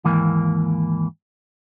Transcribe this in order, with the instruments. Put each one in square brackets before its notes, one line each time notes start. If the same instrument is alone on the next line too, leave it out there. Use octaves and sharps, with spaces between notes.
[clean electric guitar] D#2 G#2 E3 A#3